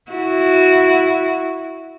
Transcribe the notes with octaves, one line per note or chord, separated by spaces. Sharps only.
E4 F#4